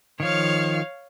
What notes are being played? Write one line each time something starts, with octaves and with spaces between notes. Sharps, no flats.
D#3 F3 C#5 F5